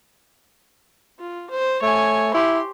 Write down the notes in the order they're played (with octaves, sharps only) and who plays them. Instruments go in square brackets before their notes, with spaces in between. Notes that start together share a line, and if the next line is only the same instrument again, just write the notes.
[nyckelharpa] F4
C5
[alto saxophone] A3 [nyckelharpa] C#5 G#5
[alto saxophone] E4 [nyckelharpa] G4 C6